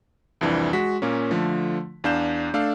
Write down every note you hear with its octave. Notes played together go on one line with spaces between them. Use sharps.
C2 F2 E3 D4
G#3 F#4 B6
A#2 A#3 C#4
D3 F3 A3
E2 D4 F5 G6 E7
A3 D4 A4 F5